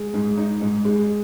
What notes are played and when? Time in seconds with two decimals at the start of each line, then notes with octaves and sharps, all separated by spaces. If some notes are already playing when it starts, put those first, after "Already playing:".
Already playing: G#3
0.14 G#2
0.37 D#4
0.61 G#2
0.85 G#3